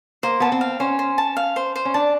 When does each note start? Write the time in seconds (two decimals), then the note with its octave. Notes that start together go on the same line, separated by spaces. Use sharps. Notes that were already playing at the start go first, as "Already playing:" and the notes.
0.23 A#3 C5
0.40 B3 A5
0.52 C4
0.61 F5
0.80 C#4 C5
0.99 C5
1.18 A5
1.37 F5
1.56 C5
1.76 C5
1.85 C#4
1.94 D4 A5